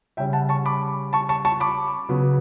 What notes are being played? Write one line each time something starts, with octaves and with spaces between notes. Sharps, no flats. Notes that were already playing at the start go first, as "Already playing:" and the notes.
C#3 G3 C#4 E5 G5
F#5 A5
A5 C#6
B5 D6
A5 C#6
A5 C#6
A5 C#6
B5 D6
C#3 F#3 B3